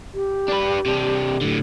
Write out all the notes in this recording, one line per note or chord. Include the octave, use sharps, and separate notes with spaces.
G4
D4 B4
C3 D4
A2 D3